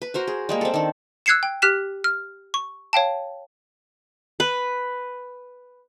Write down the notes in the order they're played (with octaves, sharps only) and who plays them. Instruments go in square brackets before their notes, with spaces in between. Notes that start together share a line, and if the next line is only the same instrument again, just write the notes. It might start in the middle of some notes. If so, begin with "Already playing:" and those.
[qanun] B4
F#4 A#4 C5
G#4
G3 G#3 A#3
C4 A4
D#3 D4
[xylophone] E6 F#6 G#6 C7 C#7 E7
G5
G4 F6 F#6 B6 E7
F6
C#6
C#5 F5 G5 A5
[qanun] B4